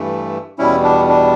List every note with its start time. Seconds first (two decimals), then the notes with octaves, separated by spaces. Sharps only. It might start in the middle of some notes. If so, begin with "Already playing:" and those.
Already playing: G2 E3 A3
0.58 E2 B2 G3 C#4 E4
0.83 D4
1.08 D4